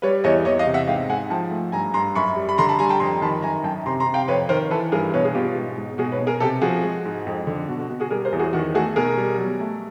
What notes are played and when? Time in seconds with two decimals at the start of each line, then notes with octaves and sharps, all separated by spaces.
0.02 G3 B4 C#5
0.24 E2 C#5 D#5
0.45 E2 C#5 D#5
0.59 D#5 F5
0.67 C3
0.74 E5 F#5
0.87 G#2 F5 G5
1.09 G#2 F#5 G#5
1.30 F3 G5 A5
1.51 A3
1.72 G2 G#5 A#5
1.94 G2 A#5 C6
2.15 F#2 B5 C#6
2.36 G3
2.49 B5
2.58 D3 A#5 C6
2.69 A5 B5
2.79 G3 G#5 A#5
2.89 G5 A5
3.00 F2 A#5 C6
3.22 D#3 A5 B5
3.42 F#2 G#5 A#5
3.64 F#2 G5 A5
3.86 C3 A#5 C6
4.00 A#5 C6
4.06 C3
4.14 F5 G5
4.28 F2 B4 C#5
4.49 D#3 A#4 C5
4.70 E3 A4 B4
4.92 G2 G#4 A#4
5.14 B2 B4 C#5
5.25 G#4
5.35 B2 F4 G4
5.56 G#2
5.77 G#2
5.98 B2 F#4 G#4
6.12 B4 C#5
6.20 B2
6.27 G#4 A#4
6.40 C3 G4 A4
6.61 F3 F#4 G#4
6.83 G#3
7.05 G#2
7.27 F2
7.47 D3
7.69 B2 F#4
7.80 F#4
7.90 B2 F#4
8.00 F#4 G#4
8.10 G3 G#4 A#4
8.25 A#4 C5
8.32 E2
8.39 F#4 G#4
8.53 D#3 F#4
8.74 A3 F#4 G#4
8.96 B2 G#4 A#4
9.17 G3
9.38 F#3
9.60 A3